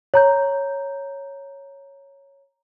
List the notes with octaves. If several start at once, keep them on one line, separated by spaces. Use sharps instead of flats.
C#5 A#5 G6